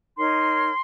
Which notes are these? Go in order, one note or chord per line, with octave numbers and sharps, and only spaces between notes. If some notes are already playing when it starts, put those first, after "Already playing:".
D#4 A#4 C#5 C6